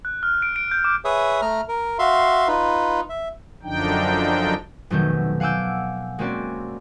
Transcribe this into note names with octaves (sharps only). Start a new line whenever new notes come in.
F#6
F6
D7
D7
G6
D6
G#4 B4 C#5 E5 D#6
A3 A#5 F6
A#4
F#4 E5 F5 C6
D#4 F4 B4
E5
F#2 D3 F3 D4 D#4 G5
F1 B2 D#3 F#3 A3 G6
F5 F#5 G#5 D6 E6 G6
G#3 A#3 C4 C#4 F#4 D5